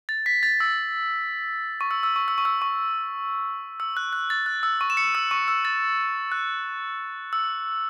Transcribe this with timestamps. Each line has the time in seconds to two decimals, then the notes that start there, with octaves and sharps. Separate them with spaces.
0.09 A6
0.26 B6
0.43 A6
0.60 E6
1.81 C#6
1.91 E6
2.03 E6
2.16 C#6
2.28 E6
2.38 C#6
2.45 E6
2.62 C#6
3.80 E6
3.97 F#6
4.13 F#6
4.30 A6
4.46 F#6
4.63 E6
4.81 C#6
4.90 E7
4.97 C#7
5.15 E6
5.31 C#6
5.48 E6
5.65 A6
6.32 F#6
7.33 E6